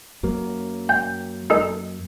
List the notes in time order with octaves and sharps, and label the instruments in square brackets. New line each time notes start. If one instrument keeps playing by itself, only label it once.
[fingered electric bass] F#2 F#3 A#3
[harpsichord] G5
D#4 A4